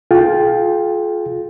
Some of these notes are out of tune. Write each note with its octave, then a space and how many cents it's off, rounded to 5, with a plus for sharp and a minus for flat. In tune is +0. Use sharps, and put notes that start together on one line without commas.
F4 +10 G#4 +40 G5 +0